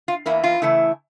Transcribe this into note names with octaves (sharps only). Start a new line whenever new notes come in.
F4
E2 E3 A#3 E4
F4
C#3 E3 A3 E4